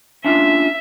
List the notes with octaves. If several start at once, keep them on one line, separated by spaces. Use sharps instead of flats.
C#4 D4 F4 E5